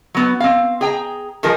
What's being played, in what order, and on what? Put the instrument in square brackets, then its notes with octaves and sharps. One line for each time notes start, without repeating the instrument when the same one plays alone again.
[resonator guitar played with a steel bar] F#3 B3
C4 F5
G#4 G5 A#5
D#3 F3 G#4 A#4